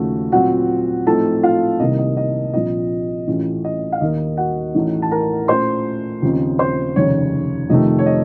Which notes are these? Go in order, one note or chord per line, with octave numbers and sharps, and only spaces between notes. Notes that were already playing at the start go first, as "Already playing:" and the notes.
Already playing: D#2 C#3 F3 A3 F#4
A#2 F#3 C4 F4 F#4 F#5
A2 F3 A3 C4 D#4 A4 A5
F4 F5
C2 C3 D#3 A#3 D#5
D#5
D#5
A#1 A#2 F3 C4 F4 D#5
A1 A2 A3 C#4 F4
D#5
F5
D#2 D#3 A#3 D#5
F#4 F#5
A1 A2 A3 D#4
A5
A#4 A#5
A#2 A3 C#4 C5 C6
D#2 C#3 F3 C4 D#4
C5 C6
F1 D#2 C#3 C#5
F2 C3 D#3 A3 D#5
C#5
D#5